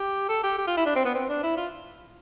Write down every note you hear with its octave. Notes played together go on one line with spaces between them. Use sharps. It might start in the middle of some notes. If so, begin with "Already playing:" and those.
Already playing: G4
A4
G4
G4
F4
E4
D4
C4
B3
C4
D4
E4
F4